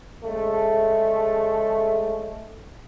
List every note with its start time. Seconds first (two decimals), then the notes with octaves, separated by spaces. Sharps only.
0.24 C#3 G#3 A3